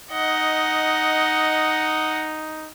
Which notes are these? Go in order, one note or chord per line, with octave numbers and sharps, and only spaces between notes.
D#4 D#5 F#5